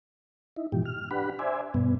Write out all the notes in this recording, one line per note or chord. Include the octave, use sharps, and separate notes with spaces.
D#4 E4
G#2 B2 E3 F3 G4
F6
D4 G4 B4 F#5 B5
C5 D5 E5 G#5
G2 B2 B3